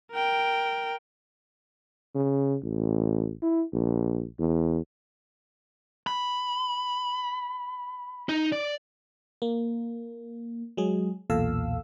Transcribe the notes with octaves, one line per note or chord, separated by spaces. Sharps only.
A#4 G5
C#3
A1
E4
A#1
E2
B5
D#4
D5
A#3
F#3 G#3 G#4
B1 E2 A#2 A4 F5 E6